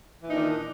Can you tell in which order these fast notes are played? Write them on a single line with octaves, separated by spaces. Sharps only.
E3 A#2 D#4 D4 D#3